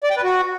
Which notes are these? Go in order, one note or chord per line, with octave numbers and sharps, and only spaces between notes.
D5
G5
B4
F#4